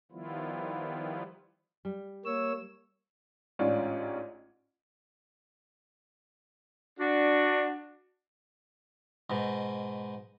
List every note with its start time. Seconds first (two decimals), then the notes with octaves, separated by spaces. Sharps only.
0.12 D#3 F3 G3 B3 E4 F4
1.85 G3
2.25 A#3 C#5 E6
3.59 A1 G#2 C#4 D4 F4 D5
6.99 D4 F#4
9.30 G#2 B2